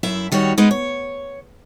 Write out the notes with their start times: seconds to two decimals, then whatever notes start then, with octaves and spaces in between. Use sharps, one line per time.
0.03 F#2 E4 E5
0.32 D#3 G3 F#4 C#5
0.57 G#3 B3 D#4 B4
0.71 C#5